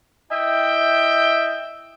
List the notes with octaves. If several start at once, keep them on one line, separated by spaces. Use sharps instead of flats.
E4 D#5 E5 G5